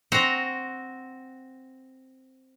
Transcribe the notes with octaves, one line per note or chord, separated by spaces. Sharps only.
C4 F#4 A#5 C6